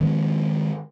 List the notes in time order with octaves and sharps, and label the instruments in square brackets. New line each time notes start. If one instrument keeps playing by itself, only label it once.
[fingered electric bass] D#3 F3 G#3 C4